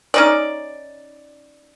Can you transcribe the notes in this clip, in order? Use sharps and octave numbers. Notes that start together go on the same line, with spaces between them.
C#4 D#4 D5